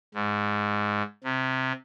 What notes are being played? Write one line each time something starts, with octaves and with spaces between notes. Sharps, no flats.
G#2
C3